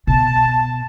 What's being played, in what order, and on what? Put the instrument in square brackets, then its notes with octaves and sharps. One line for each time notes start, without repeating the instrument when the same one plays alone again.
[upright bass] B2 [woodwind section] A5